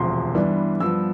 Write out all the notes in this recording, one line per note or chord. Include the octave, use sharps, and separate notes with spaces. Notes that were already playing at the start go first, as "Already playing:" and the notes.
Already playing: E1 D2 C3 F3 C6
G2 E3 G3 B3 D4
G2 F3 B3 E6